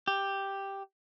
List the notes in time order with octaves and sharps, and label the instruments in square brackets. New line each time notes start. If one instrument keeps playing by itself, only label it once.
[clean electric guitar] G4